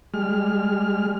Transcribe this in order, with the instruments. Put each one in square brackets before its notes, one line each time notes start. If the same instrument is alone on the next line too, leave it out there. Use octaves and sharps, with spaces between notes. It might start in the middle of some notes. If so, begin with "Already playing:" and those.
[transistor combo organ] G3 G#3 F6